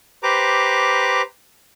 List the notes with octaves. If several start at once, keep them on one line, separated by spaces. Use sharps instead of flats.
G4 B4 C5 A#5 D6